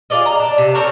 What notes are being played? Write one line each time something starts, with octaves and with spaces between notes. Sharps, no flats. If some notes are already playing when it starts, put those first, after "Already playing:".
F4 G#4 D5 D#5
A#5
D4 D5
C3
C4 A4 A#4 C#5